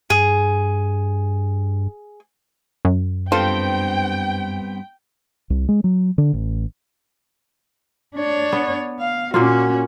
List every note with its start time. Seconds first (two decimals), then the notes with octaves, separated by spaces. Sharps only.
0.10 G2 G#4
2.85 F#2
3.32 G2 B3 C4 F4 A4 C5 G5
5.50 C2
5.69 G#3
5.84 F#3
6.18 D3
6.33 A1
8.15 D4 C#5
8.53 B3
8.99 F5
9.34 A#2 A#3 C#4 F4 F#4